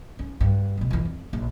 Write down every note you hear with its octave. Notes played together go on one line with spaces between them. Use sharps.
C#4
G2
A1 B2
F2 E3
F2
A#1